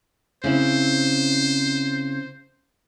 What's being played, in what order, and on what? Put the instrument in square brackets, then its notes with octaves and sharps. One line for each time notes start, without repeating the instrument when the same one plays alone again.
[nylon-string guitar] C#3 C4 E4 [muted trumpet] C5